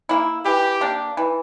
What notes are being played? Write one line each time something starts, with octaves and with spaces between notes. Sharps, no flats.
A#3 E4
E3 G4
A#3 D4
E3